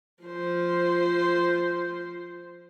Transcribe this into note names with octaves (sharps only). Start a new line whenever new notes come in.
F3 C5